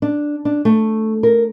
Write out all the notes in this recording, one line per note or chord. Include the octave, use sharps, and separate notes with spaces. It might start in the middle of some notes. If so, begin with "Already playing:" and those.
D4
D4
A3
A#4